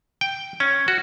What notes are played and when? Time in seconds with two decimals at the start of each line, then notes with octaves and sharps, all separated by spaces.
0.21 G5
0.60 C#4
0.88 F#4